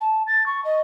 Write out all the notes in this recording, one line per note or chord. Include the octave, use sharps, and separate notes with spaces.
A5
A6
C#6
D#5